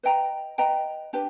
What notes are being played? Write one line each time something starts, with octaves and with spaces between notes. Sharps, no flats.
B4 D#5 G5 A#5
B4 D#5 G5 A#5
D4 G4 B4